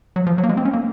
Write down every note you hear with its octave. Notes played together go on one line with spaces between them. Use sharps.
F#3
F3
F#3
A#3
G#3
C4
C#4
A#3